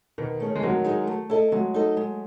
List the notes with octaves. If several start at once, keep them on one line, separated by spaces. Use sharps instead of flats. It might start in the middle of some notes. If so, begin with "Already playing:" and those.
B2 D#3
A3 C#4 G#4 C#5
G#3
A2 D#3 F#3
G#3 D#4 G#4
A3
E4 A4 D#5
F#3 G#3 A3
D#4 A4 D#5
G#3